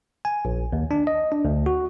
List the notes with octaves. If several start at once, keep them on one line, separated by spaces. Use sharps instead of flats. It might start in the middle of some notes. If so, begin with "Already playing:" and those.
G#5
A#1
D#2
D4
D#5
D4
D2
F#4